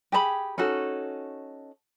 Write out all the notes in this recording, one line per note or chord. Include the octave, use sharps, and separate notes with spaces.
G4 G#4 A5 B5
C#4 D#4 F#4 A4